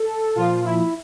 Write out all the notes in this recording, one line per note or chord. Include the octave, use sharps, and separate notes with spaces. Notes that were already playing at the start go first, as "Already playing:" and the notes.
Already playing: A4
A#2 F3 F4
E4